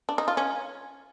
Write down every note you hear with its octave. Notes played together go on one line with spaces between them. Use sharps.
D4
D#4
F4
C#4